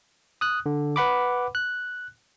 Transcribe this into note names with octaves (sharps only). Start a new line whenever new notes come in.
D#6 F#6
D3
B4 F#5 B5 D6
F#6